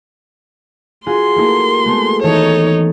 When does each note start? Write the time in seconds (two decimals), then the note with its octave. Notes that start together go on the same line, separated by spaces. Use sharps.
1.06 F4 F#4 G#4 C6
1.36 A3 A#3 E4
1.85 G#3 A3 B3
2.23 D#3 E3 D#4 A4 C#5